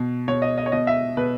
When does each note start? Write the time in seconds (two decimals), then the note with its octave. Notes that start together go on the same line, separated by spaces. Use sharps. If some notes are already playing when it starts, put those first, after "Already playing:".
Already playing: B2
0.28 B2 C#5
0.42 D#5
0.58 D#5
0.66 C#5
0.72 B2 D#5
0.87 E5
1.17 B2 B4